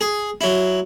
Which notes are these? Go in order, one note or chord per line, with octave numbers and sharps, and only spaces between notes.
G#4
F#3 E4